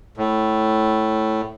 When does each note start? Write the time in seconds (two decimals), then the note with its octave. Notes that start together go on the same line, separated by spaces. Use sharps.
0.17 A2